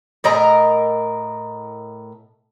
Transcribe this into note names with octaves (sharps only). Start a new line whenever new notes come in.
A2 A#4 D#5 A#5